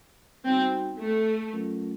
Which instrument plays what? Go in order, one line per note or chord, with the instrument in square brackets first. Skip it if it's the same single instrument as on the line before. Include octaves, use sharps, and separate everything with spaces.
[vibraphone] G3 B3 D#4 F#4 [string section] C4
[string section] A3
[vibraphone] F#3 A3 C#4 F4 A#4